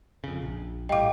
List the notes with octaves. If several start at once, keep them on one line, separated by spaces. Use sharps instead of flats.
F2 C#3
A#1
A2 G3 D#5 F5 G5 D6